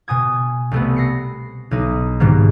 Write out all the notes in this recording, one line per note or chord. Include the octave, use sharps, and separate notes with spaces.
B2 G#5 D#6 G#6
C2 A3 B3
A#6 C7 C#7
B1 D#4
G#2 B2 D#3 G3 A#3